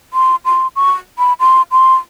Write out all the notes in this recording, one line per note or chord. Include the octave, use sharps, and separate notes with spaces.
C6
C6
C#6
B5
C6
C6